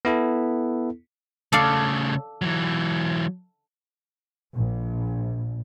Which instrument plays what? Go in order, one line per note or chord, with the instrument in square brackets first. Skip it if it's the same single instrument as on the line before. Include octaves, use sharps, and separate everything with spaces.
[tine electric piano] B3 E4 A4
[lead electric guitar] C#3 A3 [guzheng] A4 D5 F5
[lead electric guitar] E3 F#3
[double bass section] A#1